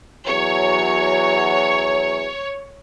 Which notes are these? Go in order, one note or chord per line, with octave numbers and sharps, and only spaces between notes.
E2 F#3 C#5